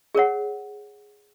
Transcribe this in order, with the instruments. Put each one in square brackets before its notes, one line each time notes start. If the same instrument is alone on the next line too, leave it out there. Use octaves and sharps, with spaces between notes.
[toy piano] G#4 A#4 C#5 F#5